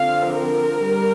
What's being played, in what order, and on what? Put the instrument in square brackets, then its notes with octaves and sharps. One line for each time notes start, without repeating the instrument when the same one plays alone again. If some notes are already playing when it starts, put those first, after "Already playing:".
Already playing: [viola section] D3 F3 C4 F5
A#4
G3